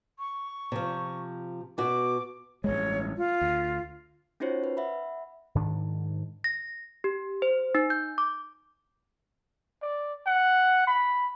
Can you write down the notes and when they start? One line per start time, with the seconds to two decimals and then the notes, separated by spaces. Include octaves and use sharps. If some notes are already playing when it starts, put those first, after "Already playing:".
0.19 C#6
0.72 C3 F3
1.78 B2 F#4 D6
2.64 A1 G2 G#3 C#5
3.17 F4
3.41 D2
4.40 C#4 D#4 F4 F#4 C5 C#5
4.64 B4
4.77 E5 F#5 B5
5.55 G#2 D#3 D4
6.44 A#6
7.04 G4
7.42 C5
7.75 D#4
7.90 G6
8.18 D6
9.82 D5
10.27 F#5
10.87 B5